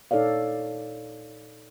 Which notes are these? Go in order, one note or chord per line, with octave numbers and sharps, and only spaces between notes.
A#2 D#4 A4 C#5 D5 F5